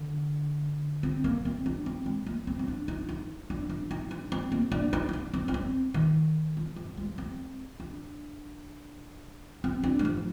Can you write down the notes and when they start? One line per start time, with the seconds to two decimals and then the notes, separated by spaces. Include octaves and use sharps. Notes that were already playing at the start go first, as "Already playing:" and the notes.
Already playing: D3
1.03 C4
1.24 A#3
1.45 C4
1.66 D4
1.86 C4
2.06 G#3
2.27 A#3
2.47 C4
2.59 C4
2.68 D4
2.88 D#4
3.09 D#4
3.50 D4
3.70 D4
3.91 D#4
4.11 D4
4.32 C4
4.52 A#3
4.72 D4
4.93 D#4
5.09 D#4
5.13 D4
5.34 C4
5.48 D4
5.54 C4
5.94 D#3
6.57 F3
6.76 F3
6.97 G#3
7.18 C4
7.80 D4
9.64 C4
9.84 D4
9.99 G3
10.05 F3